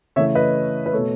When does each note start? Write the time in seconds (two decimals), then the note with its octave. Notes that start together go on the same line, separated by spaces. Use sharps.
0.16 C#3 E3 A3 C#5 E5
0.35 B4 D#5
0.86 B4
0.93 B2 A3 A4 C#5